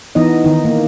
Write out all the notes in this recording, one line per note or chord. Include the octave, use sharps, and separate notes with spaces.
E3 B3 D#4 D#5
D#3 D#4
A#3